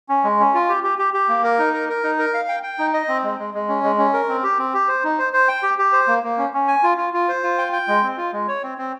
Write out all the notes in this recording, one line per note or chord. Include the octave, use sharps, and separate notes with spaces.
C#4
G#3
C#4
F4
G4
G4
G4
G4
A#3
A#4
D#4
A#4
A#4
D#4
A#4
F5
G5
G5
D#4
D#5
C4
G#3
G#3
G#3
C#4
G#3
C#4
A#4
C4
G4
C4
G4
C5
D#4
C5
C5
G5
G4
G4
C5
A#3
A#3
C#4
C#4
G#5
F4
F4
F4
C5
F4
G5
G5
G#3
C4
F4
G#3
C#5
C4
C4